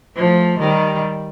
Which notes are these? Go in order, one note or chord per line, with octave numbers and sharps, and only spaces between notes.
F3 A3
D#3 G3